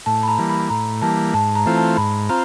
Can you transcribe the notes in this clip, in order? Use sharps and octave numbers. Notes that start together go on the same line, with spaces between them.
A2 A5
B5
A#5
E3 G3 A#3
B5
A2 A#5
E3 G3 A#3 A5
G#2 A5
A#5
E3 A3 C4 F4
A5
G#2 B5
C4 F4 A#5